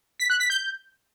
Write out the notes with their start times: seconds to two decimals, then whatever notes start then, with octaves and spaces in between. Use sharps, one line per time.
0.20 B6
0.30 F#6
0.40 B6
0.50 G6